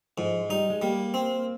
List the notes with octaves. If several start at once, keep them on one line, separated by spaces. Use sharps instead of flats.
G#2 F3
G3 D#4
G#3
G3 A#3
C4